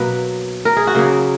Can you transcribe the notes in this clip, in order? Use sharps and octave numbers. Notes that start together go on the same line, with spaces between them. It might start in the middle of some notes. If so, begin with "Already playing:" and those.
Already playing: B2 F#3 A#3 B4
A#4
G#4
F#4
C#3 F#3 A#3 G#4